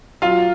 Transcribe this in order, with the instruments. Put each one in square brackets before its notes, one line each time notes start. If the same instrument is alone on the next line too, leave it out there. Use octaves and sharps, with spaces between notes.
[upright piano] F#3 F4 F5